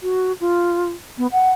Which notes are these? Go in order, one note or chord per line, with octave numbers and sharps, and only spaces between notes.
F#4
F4
B3
F#5